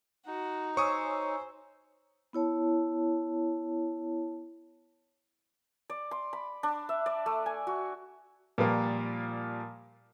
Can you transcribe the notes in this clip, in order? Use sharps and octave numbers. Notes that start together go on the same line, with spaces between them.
D#4 F#4
C5 C#5 G#5 C#6 D#6 E6
B3 E4 C#5 A5
D5
C6
B5
D4
E5
D5
A3
G#5
F#4
A#2 F3 G3 A#3